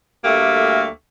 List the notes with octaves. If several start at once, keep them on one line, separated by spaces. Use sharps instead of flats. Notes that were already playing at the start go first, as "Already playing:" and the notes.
D2 G3 A3 A#3 G4 E5